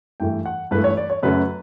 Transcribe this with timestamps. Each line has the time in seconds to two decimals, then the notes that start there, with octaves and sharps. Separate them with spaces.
0.20 G2 E3 A3 G5
0.46 F#5
0.71 G2 E3 A3 B4
0.84 C#5
0.97 D5
1.10 C#5
1.23 F#2 C#3 F#3 A3 B4